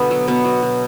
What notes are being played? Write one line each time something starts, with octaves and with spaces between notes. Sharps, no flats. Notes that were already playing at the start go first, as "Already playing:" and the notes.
Already playing: B2 D3 A3 B3 D4
F#3
B2 B3
F#3
B2